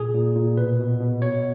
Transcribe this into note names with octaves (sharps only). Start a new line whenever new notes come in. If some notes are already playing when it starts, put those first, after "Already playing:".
Already playing: A#2 G#4
A#2
A#2
B2 B4
B2
B2
B2 C#5